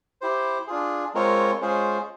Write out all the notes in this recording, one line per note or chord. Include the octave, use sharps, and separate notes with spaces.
E4 G4 C5
D4 F4 G#4
G#3 C4 F4 A#4 C#5
G#3 C#4 F4 G#4 C5